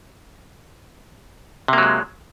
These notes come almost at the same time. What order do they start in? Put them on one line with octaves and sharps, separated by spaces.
C3 A#3 F#3 G#3